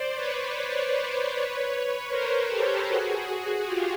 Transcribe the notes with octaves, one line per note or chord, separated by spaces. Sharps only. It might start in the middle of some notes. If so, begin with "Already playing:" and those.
Already playing: C5 D5
B4 C#5
B4 C#5
B4 C#5
A#4 C5
G4 A4
F#4 G#4
F#4 G#4
F4 G4